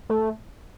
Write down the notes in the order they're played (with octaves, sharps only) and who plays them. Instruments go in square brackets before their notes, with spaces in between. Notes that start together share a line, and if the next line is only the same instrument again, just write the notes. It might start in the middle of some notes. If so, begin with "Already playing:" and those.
[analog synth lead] A3